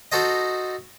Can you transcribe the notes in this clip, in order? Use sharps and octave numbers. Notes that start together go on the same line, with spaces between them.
D#4 F#4 A4 C5 D#5